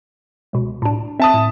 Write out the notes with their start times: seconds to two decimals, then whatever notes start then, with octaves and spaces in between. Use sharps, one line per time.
0.53 C#2 B2
0.82 A2 D4
1.20 C4 E5 A5 D#6
1.34 A2